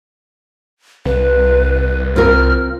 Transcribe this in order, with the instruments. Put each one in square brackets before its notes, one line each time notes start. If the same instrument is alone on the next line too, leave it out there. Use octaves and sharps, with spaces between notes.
[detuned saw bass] C2 [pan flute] B4
[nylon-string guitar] C4 F4 A#4 [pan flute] F6